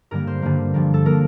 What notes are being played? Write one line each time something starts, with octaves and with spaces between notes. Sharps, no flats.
G2 D3 G3 A#3 A#4
C5
G2 D3 G3 A#3
G2 F3 A#3
A4
F3 A#3 A#4